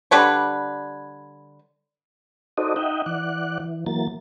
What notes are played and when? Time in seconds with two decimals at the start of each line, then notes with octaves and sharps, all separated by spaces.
0.11 D3 G3 B4 C#5
2.58 D#4 F#4 A4 C5 D5 D#5
2.76 D#4 D#5 E5 F#5 G5
3.06 E3 D5 F#5 F#6
3.60 E3
3.86 E3 F#3 A#3 A6